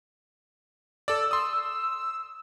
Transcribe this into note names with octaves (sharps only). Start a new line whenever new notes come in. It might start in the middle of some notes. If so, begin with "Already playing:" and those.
A4 D5 E6
C6 D#6